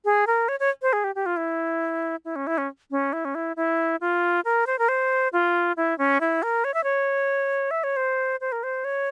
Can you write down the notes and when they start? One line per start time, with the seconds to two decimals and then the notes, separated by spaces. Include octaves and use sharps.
0.05 G#4
0.27 A#4
0.49 C#5
0.60 C#5
0.82 C5
0.93 G#4
1.04 G4
1.15 G4
1.26 F4
1.37 E4
2.25 E4
2.36 C#4
2.47 E4
2.58 C#4
2.91 C#4
3.13 E4
3.25 C#4
3.35 E4
3.56 E4
4.01 F4
4.45 A#4
4.67 C5
4.79 A#4
4.89 C5
5.33 F4
5.77 E4
5.98 C#4
6.21 E4
6.43 A#4
6.64 C#5
6.74 E5
6.84 C#5
7.71 E5
7.84 C#5
7.97 C5
8.41 C5
8.52 A#4
8.63 C5
8.84 C#5